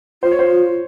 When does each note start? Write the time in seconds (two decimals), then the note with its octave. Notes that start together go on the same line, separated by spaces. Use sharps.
0.23 F4 C5
0.31 C#5
0.39 C5